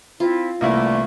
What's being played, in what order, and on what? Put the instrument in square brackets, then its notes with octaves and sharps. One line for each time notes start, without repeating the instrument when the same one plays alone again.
[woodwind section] C4 E4 [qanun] F4
[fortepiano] C2 A#3 E4 [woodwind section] D3 E3 A3